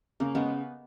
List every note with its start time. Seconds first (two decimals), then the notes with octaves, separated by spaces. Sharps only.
0.20 C#3 A#3
0.35 C#3 G#3 B3